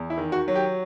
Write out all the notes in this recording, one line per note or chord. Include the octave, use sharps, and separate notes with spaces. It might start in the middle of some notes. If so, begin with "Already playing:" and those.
Already playing: E2
E4
D#3
F#4
F#3
G4